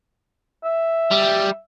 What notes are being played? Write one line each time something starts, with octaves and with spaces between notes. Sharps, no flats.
E5
G3